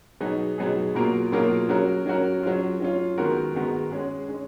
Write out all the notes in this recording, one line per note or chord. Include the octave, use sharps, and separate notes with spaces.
B2 F#3 B3 D#4 G#4
B2 F#3 B3 D#4 G#4
B2 F#3 A#3 F4 A#4
B2 F#3 A#3 F4 A#4
F#3 C#4 F#4 A#4
F#3 C#4 F#4 A#4
F#3 C#4 F4
F#3 C#4 F4
D#3 G#3 B3 F#4 A#4
D#3 G#3 B3 F#4 A#4
G#3 C#4 G#4
G#3 C#4 G#4